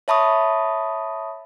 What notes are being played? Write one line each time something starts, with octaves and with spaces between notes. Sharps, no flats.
C#5 E5 A5 B5 C#6 D#6